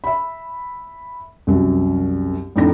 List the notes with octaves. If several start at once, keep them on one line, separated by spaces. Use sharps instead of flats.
E5 B5
C2 F#2
F2 A2 D4 D#4 A#6